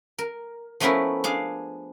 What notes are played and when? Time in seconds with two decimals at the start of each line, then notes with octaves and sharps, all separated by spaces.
0.18 A#4
0.80 F3 A3 B3 C#4 E4 A#4
1.24 D4 G#4 F5